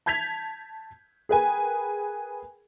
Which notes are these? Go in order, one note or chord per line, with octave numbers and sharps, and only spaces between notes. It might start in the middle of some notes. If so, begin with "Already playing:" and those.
A5 G6 G#6 B6 F7
G#4 A#4 B4 G5 G#5